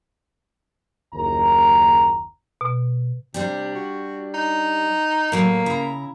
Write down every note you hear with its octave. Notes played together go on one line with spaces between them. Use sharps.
F#1 D#2 A#5
B2
C3 G3 D4 G4
F#4
D#4
A2 F#3 A#3 B3
C#3 E4 A#5